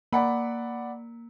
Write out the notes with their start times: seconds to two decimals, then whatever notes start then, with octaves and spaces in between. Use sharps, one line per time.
0.13 A#3 D5 F#5 B5